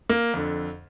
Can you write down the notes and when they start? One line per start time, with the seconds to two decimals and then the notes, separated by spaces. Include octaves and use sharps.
0.09 A#3
0.34 F2 D3